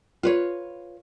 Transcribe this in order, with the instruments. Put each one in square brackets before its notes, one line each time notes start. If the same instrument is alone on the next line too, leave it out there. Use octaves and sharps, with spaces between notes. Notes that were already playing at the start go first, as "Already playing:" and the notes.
[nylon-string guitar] F4 B4 C#5